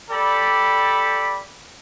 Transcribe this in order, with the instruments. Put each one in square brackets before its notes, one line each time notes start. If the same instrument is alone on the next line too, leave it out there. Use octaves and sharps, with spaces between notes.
[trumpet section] G3 A4 D5 G5 B5